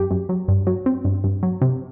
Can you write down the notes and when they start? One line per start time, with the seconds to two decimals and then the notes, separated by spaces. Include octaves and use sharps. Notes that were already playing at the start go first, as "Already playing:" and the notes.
Already playing: F#2 G4
0.11 F#2
0.29 F#3
0.48 G2
0.67 F#3
0.86 C4
1.05 G2
1.24 G2
1.43 F#3
1.62 C3